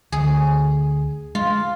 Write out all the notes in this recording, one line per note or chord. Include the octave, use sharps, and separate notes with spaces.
D2 G#4
G#3 F4